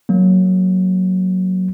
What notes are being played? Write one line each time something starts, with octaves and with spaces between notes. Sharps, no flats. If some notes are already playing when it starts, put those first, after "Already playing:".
F#3 A#3